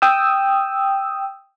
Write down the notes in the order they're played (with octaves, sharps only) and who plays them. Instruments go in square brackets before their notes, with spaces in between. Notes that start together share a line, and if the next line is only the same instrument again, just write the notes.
[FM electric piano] G5 D#6 E6